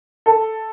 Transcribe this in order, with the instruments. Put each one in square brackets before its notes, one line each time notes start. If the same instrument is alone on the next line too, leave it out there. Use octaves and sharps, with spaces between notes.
[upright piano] A4